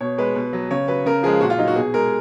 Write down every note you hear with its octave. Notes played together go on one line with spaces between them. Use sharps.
B2 C#5
G#3 B4
B2
F#3
C#3 C#5
F#3 B4
C#3 A#4
F3 G#3 G#4
A#2 F#4
F4
F#3 D#4
F#4
B2 G#4
G#3 A#4